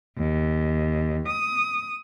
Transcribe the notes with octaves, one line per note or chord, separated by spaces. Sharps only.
D#2
D#6